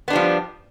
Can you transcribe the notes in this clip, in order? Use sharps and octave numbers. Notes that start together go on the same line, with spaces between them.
F3 G3 B3 D4